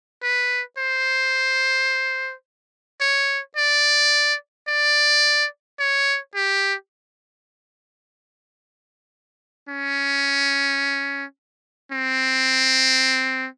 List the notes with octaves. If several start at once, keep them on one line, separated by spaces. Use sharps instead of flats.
B4
C5
C#5
D5
D5
C#5
G4
C#4
C4